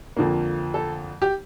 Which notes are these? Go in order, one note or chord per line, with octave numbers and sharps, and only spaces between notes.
F2 D3 F3 A#3
A4
G4